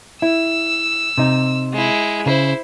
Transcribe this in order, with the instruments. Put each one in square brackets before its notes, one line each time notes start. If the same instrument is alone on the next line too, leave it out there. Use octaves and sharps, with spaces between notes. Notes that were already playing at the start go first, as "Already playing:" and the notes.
[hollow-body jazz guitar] E4 [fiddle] E6
[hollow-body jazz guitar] C3 D#4
[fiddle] G#3 E4
[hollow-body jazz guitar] C#3 [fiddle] E4 C5